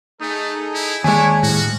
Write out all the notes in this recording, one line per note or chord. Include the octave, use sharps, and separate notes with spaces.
A3 D#4 G#4 A4
E4
D#2 G#3 D4 E4 C#5 G#5
A2 C3 F3 G3 F#4